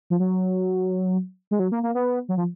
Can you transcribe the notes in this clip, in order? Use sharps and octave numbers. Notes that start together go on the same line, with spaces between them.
F3
F#3
G#3
F#3
A#3
A#3
B3
F#3
F3